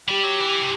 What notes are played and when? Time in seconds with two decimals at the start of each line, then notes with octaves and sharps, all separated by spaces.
0.08 G3 G4
0.23 F#3
0.40 E3
0.61 C3